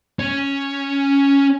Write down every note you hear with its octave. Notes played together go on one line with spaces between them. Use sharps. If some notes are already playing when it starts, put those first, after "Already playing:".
C#4